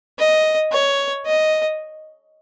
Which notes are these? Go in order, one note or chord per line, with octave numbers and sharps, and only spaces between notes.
D#5
C#5
D#5